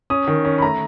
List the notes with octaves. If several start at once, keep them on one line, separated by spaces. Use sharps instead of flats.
C#4 D#6
D#3
C#4
B5
A3 A#5